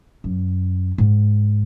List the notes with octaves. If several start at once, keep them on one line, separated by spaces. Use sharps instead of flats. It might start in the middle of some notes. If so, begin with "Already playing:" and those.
F#2
G#2